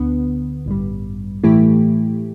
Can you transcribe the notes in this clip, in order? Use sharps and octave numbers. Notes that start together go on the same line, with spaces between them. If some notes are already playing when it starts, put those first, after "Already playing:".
Already playing: D2 D3 B3
A1 G2 G3
A2 E3 A3 E4 G4